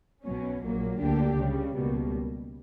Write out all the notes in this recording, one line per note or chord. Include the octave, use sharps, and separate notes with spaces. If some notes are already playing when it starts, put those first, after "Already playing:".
B1 B2 F#3 C#4
A#1 A#2 F#3 A#3
D2 D3 A#3 D4 G4
C#2 C#3 G3
C#2 B2 G3 A#3